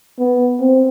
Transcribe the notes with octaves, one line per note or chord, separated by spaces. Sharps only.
B3
C4